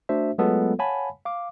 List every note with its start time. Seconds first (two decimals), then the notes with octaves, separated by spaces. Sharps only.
0.09 A3 D4 F#4 C5 E5
0.38 F#3 G#3 A3 B3 F4 A4
0.79 C#5 F5 F#5 G#5 A5 B5
1.25 F5 D6